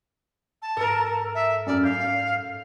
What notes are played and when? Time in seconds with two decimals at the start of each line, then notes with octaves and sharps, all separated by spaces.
0.62 A5
0.77 G#2 A4 A#4
1.34 E5
1.66 F#2 D5 F6
1.83 F5 G6